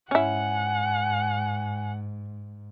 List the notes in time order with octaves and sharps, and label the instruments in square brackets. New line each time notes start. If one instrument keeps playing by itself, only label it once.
[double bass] G#2 [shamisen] C#4 E4 [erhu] F#5 [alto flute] G#5